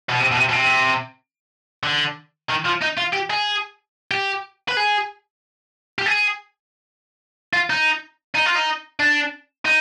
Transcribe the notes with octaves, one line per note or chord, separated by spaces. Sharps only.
B2
C3
B2
C3
B2
C3
D3
D#3
F3
D#4
F4
G4
G#4
G4
B4
G#4
G4
G#4
F4
D#4
D#4
F4
D#4
D4
D#4